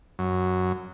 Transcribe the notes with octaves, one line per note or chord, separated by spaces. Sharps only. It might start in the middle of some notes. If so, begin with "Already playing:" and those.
F#2